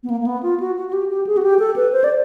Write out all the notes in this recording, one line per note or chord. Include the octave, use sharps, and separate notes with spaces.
B3
A#3
A#3
B3
F4
F#4
F#4
F#4
G4
G4
G#4
F#4
G4
A4
B4
C5
D5